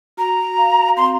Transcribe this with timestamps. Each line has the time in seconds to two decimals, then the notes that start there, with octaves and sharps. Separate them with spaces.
0.17 F#4 A#5
0.58 F5
0.97 C4 C6